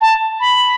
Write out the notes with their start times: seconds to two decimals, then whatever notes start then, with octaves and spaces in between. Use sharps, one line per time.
0.01 A5
0.40 B5